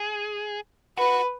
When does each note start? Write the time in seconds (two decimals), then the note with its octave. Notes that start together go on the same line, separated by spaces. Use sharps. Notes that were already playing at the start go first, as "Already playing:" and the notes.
Already playing: G#4
0.97 F#4 B4